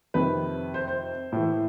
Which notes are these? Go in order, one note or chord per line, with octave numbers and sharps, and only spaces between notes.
F2 C3 D#3 B4
C5
C5
A2 E3